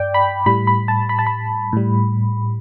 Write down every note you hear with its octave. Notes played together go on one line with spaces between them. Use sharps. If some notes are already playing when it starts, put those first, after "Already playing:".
Already playing: G2 D5 G5
B5
A2 G3 B5
B5
A5
B5
A5
B5
A2 G3